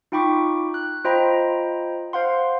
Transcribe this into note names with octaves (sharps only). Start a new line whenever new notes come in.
D#4 F4 G5 B5 C#6 D6
F#6
F4 C5 D#5 G5 A#5 B5
C5 F5 F#5 C6